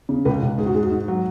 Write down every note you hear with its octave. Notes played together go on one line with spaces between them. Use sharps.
C#3
C#2 B4
C#2
G#2 G#4
F#4
G#2 G#4
F#4
G#2
F#3